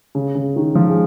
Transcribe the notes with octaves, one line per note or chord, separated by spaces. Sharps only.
C#3
C#3
D#3
F3
G#3